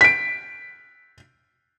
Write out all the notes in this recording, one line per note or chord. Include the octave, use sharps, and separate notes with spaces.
B6 D7